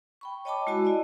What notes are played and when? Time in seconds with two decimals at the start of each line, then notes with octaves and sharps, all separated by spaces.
0.21 G5 B5 C#6
0.45 C#5 D#5 G5 A5 B5 D6
0.67 G#3 E4 F#4 D#5 A5 E6
0.85 E4 D5 D#5